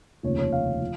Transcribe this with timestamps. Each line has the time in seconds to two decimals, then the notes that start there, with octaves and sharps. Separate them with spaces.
0.23 F1 D#2 C#3 F3 C#5
0.39 C#5
0.53 F5
0.81 F3